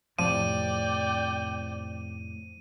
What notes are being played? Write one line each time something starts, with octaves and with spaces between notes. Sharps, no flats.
F2 A2 C3 F3 D5 G5 D#7